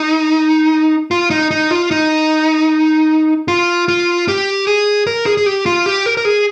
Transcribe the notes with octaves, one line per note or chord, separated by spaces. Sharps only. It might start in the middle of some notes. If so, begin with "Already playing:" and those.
Already playing: D#4
F4
D#4
D#4
F4
D#4
F4
F4
G4
G#4
A#4
G#4
G#4
G4
F4
G4
A#4
A#4
G#4